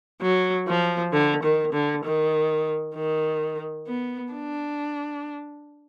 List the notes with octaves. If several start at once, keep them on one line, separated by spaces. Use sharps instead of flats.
F#3
F3
D3
D#3
D3
D#3
D#3
B3
D4